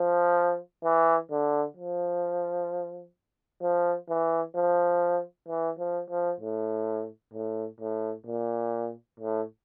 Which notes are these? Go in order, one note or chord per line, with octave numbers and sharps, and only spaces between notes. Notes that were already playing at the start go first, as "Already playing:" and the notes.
Already playing: F3
E3
D3
F3
F3
E3
F3
E3
F3
F3
A2
A2
A2
A#2
A2